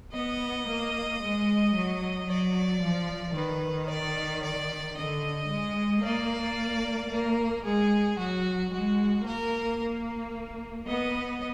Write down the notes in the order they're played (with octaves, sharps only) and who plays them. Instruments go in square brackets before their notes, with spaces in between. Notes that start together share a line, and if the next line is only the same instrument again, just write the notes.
[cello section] B3 [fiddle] D#5
[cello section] A#3
G#3
F#3
[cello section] F#3 [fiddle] D5
[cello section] F3
[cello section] D#3 [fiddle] B4
[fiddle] D5
D5
[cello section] D3 [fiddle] D#5
[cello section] G#3
[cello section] A#3 [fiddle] D5
[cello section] A#3 [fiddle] A#4
[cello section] G#3 [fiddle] G#4
[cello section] F#3 [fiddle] F#4
[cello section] G#3 [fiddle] F#4
[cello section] A#3 [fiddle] A#4
[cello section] B3 [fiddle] D#5